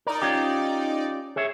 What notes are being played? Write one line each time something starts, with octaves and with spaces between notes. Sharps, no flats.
D#4 A#4 D5
C#4 F4 G4
G#4 C#5 E5